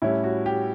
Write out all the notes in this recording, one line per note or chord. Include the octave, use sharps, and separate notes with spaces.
A2 G3 C#4 E4
F#4
G4